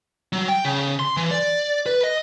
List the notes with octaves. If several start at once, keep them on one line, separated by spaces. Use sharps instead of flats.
F#3
G5
C#3
C6
E3
D5
B4
D#5